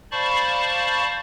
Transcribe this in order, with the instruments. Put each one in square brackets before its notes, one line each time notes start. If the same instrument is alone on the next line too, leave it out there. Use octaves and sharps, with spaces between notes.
[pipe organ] C5 D5 F5 A5 B5 C#6